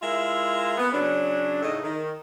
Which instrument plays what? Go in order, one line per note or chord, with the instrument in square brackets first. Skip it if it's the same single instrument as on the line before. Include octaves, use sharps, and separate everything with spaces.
[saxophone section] G#3 E4 F4 A#4 E5
B3
C#3 F#3 C#4 D4
A2 C#3 A3 D#4 D#5
D#3